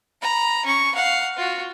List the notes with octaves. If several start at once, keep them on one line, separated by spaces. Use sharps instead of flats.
A#5 B5
C#4 C#6
F5 F#5
F4 F#4